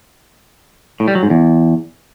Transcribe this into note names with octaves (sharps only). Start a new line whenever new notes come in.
A2
G3
F#3
G#2
E2